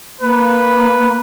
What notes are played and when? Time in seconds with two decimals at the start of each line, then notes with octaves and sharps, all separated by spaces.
0.21 A#3 B4